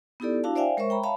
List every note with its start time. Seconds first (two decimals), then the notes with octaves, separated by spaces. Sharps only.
0.20 B3 D#4 E4 G4 A4 D5
0.44 D4 E4 F#4 F5 A5
0.55 C5 D5 E5 F5 G5 G#5
0.77 G#3 A#4 C5 C#5 E5 C#6
0.90 G5 A#5 B5
1.03 C#5 E5 F5 A5 B5